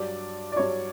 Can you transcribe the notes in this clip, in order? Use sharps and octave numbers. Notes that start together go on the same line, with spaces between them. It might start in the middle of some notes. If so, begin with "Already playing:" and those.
Already playing: G2 F#3 D5
D5
G2 F#3 C#5